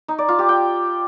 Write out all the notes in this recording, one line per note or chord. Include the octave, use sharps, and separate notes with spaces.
D#4
D5
F4
G4
G5